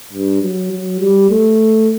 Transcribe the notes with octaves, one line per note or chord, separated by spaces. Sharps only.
G2
F#3
F#3
G3
A3